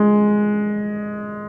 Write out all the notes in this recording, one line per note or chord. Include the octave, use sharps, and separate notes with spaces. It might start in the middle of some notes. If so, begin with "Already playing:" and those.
Already playing: G#3